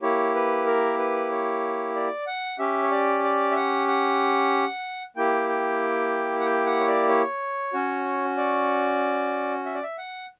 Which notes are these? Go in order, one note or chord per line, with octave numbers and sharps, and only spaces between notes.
A#3 E4 G4 C#5
B4
A#4
B4
C#5
D5
F#5
C#4 G4 E5
C#5
D5
D5
E5
F#5
F#5
A#3 E4 G4 G5
G5
F#5
G5
F#5
C#5
D5
C#5
C#4 F#4
D5
E5
D5
E5
F#5